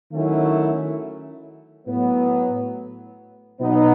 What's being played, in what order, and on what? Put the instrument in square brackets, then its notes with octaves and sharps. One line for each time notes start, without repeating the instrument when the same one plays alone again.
[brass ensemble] D#3 F#3 A3 C#4 E4
A2 F#3 B3
B2 F#3 B3 D#4